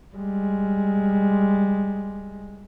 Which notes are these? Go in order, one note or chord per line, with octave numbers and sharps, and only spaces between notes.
G3 G#3